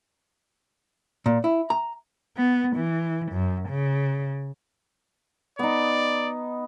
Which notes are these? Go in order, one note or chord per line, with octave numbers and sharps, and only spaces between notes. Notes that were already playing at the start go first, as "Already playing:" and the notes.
A#2
E4
A#5
B3
E3
F#2
C#3
B3 D#4 D5